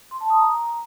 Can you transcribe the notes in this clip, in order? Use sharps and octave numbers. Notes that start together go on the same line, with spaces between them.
C6
A5
D#6
A#5